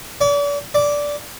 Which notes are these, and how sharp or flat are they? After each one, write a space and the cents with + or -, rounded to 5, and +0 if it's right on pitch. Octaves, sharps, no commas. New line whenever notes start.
D5 -40
D5 -10